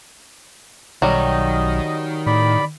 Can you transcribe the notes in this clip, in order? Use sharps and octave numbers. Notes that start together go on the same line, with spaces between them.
B1 D#3 F#3 G3 D#5
A2 D5 B5